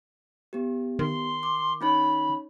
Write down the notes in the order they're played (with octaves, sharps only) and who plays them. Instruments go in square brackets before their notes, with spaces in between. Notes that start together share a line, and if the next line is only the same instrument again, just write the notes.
[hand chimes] B3 G4
[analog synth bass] D#3 [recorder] C6
[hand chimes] D6
[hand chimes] C#4 D#4 C#5 [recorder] B5